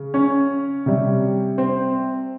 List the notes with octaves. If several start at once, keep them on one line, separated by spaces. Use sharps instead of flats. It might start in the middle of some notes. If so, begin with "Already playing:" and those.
Already playing: C#3
C#4 C#5
C3 G3
C4 C5